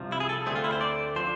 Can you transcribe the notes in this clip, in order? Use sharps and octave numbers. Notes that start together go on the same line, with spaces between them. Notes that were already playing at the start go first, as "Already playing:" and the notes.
Already playing: C2 C3 F3
E4
G#4
A4
D2 D3 A3 C4 G#4
F4
E4
C5
D5
D3 F3 C5